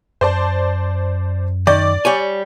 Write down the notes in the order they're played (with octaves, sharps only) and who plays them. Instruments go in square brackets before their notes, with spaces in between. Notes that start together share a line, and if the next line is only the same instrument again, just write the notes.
[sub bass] F#2 [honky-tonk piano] C5 D5 A5
[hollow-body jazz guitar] D#3 [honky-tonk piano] D5
[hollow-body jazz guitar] G3 C#5 G#5